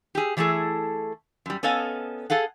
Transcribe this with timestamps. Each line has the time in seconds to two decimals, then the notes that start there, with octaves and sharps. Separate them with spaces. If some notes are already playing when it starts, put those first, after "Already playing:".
0.15 G4 G#4
0.37 E3 F#3 A3 E4 G#4 A4
1.46 F#2 G3
1.63 B3 C#4 A4 D#5 F5 G#5
2.30 G#4 A4 F5 F#5